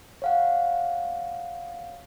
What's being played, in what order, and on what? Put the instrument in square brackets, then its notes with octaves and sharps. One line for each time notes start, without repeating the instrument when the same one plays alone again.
[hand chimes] C#5 F5 F#5